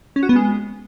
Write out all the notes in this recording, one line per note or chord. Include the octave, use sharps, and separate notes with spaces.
C#4
F#4
B3
G#3